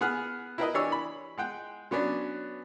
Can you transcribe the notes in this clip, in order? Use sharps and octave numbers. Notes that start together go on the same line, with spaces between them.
B3 G#4 F#5 F6
E4 A#4 B4 D#5
E3 D4 G4 C#5 E6
B5
G#3 F#5 G5
F#3 B3 C#4 D4